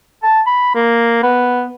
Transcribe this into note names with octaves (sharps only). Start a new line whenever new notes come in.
A5
B5
A#3
B3